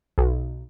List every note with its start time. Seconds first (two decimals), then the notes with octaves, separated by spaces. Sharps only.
0.18 B1